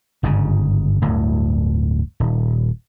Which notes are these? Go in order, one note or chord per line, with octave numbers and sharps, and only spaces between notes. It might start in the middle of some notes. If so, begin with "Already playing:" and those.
G1 G#2 C#3
D1 D2 G2
D#1